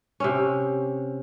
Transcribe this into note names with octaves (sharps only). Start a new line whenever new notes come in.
C3 C4 C#4